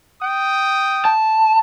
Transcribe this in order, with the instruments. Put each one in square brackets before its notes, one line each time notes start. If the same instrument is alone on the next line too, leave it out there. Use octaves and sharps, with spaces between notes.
[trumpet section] G5 D#6
[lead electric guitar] A5